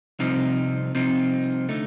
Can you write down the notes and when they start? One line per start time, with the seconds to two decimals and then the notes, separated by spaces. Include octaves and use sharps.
0.19 C2 C3 F3 C4 D#4
0.95 C2 C3 F3 C4 D#4
1.69 D3 A3 D#4